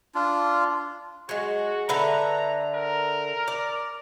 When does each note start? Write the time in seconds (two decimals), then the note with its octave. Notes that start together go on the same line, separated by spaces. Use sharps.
0.15 D4 F4
1.29 F#3 G#3 F#4
1.89 D3 B4 E5 A#5
2.75 A#4
3.48 D5